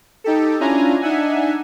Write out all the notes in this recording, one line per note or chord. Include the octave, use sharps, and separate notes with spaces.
D#4 G4 A4
C#4 D4 E4 F4 G#5 A#5
D4 D#4 E5 F#5 G#5